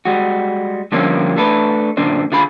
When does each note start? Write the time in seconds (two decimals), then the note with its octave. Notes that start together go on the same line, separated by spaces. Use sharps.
0.05 G3 G#3 F#4
0.92 D3 F3 G3 A#3 C4 C#4
1.36 A3 D4 A4 B4
1.97 F#2 A#2 D3 C4 D4
2.32 D3 F4 G#4 B5